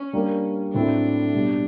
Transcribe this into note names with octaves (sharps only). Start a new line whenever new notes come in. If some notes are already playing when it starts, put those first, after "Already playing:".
Already playing: C#4
G3 A#3 D4 G4 A#4
A2 F#3 A3 C4 D4 E4
B2 G3 C4